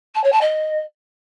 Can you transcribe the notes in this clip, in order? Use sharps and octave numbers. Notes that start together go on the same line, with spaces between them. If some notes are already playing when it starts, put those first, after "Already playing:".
A5
C#5
A5
D#5